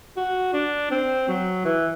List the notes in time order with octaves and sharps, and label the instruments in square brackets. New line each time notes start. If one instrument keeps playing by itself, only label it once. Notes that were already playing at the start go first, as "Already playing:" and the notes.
[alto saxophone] F#4
D4
C4
F#3
E3